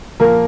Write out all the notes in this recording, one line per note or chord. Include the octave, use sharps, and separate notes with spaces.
A#2 F3 A#3 A#4